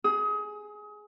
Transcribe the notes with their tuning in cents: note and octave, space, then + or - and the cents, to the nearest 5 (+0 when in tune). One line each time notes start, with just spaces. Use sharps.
G#4 +10 D#6 +30